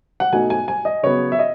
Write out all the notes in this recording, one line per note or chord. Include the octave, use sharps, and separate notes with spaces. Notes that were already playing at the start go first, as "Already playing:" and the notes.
F#5
B2 A3 D#4 G#5
G#5
G#5
D#5
C#3 F#3 B3 C#5
E5
D#5